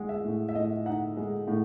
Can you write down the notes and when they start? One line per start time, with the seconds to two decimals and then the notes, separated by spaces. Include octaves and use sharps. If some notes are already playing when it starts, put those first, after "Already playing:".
Already playing: G#3 F#5
0.09 E5
0.24 A2
0.49 E5
0.55 A2 D#5
0.86 D#4 F#5
1.17 G#3
1.48 A2